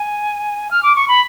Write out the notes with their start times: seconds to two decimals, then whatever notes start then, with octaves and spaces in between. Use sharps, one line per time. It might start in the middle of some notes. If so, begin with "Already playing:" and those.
Already playing: G#5
0.71 F6
0.83 D6
0.96 C#6
1.08 B5